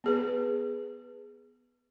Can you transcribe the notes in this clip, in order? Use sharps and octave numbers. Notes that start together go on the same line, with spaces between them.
B3 G#4 B4